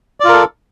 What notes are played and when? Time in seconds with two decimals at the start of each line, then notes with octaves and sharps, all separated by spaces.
0.20 D5
0.25 F4
0.29 A#4
0.33 A4